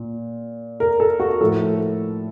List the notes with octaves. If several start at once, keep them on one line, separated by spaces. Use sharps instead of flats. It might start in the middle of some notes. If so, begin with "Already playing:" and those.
Already playing: A#2
A#4
A4
F#4
A2 F3 A4